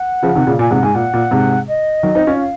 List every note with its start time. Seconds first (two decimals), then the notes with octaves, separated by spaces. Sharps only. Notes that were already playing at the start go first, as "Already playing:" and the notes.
Already playing: F#5
0.23 C#3 F3
0.35 C3 D#3
0.47 A#2 C#3
0.59 A#2 G#5
0.71 G#2 C3 F#5
0.83 G#2 G#5
0.95 A#2 F#5
1.13 A#2
1.31 G#2 C3
1.68 D#5
2.03 D#3 F#3
2.15 C4 D#4
2.27 C#4 F4
2.40 F5